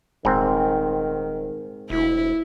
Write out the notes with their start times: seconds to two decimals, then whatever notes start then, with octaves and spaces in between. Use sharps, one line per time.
0.25 D#1 G#2 D#3 C4
1.90 E1 D2 E4